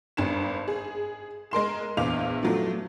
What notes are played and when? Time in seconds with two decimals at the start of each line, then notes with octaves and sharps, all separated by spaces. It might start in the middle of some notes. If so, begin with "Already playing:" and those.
0.17 G#1 G2 E7
0.68 G#4
1.51 G#3 A#4 C6 E7
1.97 A#1 E2 F5 D6 F7
2.43 F3 F#3 A3